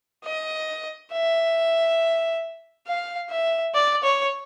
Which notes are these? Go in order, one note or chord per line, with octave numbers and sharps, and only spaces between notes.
D#5
E5
F5
E5
D5
C#5